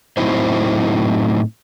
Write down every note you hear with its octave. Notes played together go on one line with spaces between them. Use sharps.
A2 F#3 C4 D#4 E4 C5